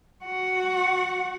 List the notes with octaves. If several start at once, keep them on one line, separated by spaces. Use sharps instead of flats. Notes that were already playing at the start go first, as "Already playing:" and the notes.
F#4 F#5